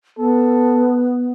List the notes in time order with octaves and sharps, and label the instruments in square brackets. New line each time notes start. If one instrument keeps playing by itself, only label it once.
[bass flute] B3 [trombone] A4